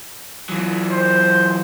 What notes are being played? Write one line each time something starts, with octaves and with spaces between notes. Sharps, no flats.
E3 F#3
C5